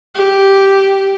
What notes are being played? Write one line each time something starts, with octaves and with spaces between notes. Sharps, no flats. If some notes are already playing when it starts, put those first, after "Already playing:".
G4